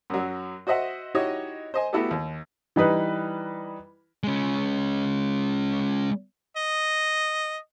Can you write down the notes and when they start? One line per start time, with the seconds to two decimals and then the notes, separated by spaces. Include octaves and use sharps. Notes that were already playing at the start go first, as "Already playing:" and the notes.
0.10 F#2 F#3
0.67 F#4 C5 D#5 E5 F#5
1.15 D#4 E4 F#4 G4 C#5 D#5
1.74 C5 D#5 G#5
1.93 A3 B3 E4 F#4 G4 A4
2.11 D#2
2.76 E3 G3 D#4 B4
4.23 G#3 C#4
6.57 D#5